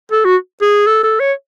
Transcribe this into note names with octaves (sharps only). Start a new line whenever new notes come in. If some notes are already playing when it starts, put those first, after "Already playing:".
A4
F#4
G#4
A4
A4
C#5